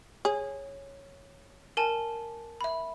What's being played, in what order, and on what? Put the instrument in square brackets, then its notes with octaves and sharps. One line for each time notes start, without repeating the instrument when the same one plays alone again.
[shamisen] G#4 [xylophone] C#5
[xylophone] A#4 G#5 A5
E5 B5